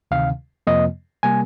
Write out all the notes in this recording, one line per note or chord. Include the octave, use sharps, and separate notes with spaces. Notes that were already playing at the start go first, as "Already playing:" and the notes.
D2 C3 D#3 F5
F2 C3 F3 A#3 D#5
C3 G3 A#3 G#5